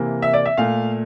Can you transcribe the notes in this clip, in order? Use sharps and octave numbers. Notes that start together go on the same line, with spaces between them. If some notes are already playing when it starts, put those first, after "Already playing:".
Already playing: C3 E3 A#3
E5
D5
E5
A#2 A3 F5